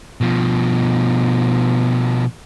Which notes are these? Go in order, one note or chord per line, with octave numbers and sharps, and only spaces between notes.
B2 F3